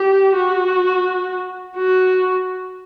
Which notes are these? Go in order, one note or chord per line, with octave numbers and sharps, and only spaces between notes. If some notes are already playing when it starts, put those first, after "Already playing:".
Already playing: G4
F#4
F#4